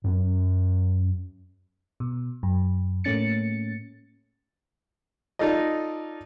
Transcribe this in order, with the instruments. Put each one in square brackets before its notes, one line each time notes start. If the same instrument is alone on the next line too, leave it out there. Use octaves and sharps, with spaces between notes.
[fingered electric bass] F#2 B3 C#4
[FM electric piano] B2
F#2
A2 A3 A#3 C#4 A6 C#7
[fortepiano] D#4 F4 A4 D5 D#5